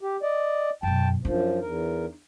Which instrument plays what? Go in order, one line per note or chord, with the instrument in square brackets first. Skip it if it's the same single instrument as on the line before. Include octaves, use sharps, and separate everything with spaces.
[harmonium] G4
D5 D#5
[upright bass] F#2 B2 [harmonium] G5 A5
[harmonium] F#2 F3 [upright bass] D4 D#4
[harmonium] E2 A#4